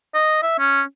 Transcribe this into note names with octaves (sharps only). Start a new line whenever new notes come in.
D#5
E5
C#4